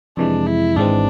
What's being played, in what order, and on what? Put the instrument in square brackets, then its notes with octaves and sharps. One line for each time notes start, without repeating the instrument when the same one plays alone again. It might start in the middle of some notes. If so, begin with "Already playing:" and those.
[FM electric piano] F2 C3 E3 G#3 [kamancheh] D4
[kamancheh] E4
[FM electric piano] G#1 G#2 E3 G#3 C4 [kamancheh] D4